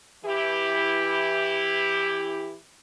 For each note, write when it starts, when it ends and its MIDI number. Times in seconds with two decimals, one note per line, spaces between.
0.25 2.56 52
0.25 2.56 64
0.25 2.56 67